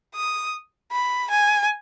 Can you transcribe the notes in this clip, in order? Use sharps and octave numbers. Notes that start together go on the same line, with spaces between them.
D#6
B5
G#5